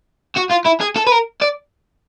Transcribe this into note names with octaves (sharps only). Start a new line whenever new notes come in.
F#4
F4
E4
G#4
A4
B4
A#4
D5